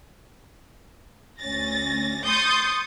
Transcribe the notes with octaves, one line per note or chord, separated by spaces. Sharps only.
D2 C#4 A6 A#6
C6 C#6 D#6 G6 A6 C7